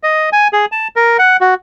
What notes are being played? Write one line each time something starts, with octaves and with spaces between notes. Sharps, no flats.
D#5
G#5
G#4
A5
A#4
F#5
F#4